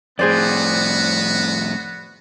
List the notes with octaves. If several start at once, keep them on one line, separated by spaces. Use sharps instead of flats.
F2 A2 B3 F#4 G#4 C5 D5